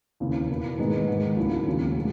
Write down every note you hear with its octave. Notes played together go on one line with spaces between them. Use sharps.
D#2 C#3 E3
E2 B2 A#3 E4
G#2 D#3 G#3 B3 D#4
G#2 D#3 G#3
C#2 C#3 F#3 A#3 E4
D#2 C#3 F#3
B2 G#3